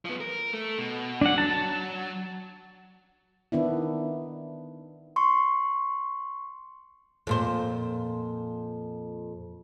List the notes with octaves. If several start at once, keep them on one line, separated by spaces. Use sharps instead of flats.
F3 B3
A#4
A3
B2
F#3 D4 F#5
A5
D#3 B3 D4 E4
C6 C#6
F2 A#2 C5